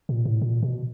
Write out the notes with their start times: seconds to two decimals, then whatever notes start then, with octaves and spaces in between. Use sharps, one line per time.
0.09 A#2
0.25 A2
0.42 A#2
0.63 B2